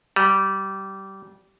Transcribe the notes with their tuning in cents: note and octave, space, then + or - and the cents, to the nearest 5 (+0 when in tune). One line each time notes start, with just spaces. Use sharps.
G3 -20